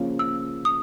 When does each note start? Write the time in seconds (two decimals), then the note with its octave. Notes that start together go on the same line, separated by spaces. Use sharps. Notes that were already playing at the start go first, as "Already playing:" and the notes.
Already playing: C#3 F3 A#3 C#4 F4
0.19 E6
0.65 D#6